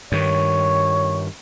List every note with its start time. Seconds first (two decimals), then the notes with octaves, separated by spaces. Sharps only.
0.12 G2 D#3 C#5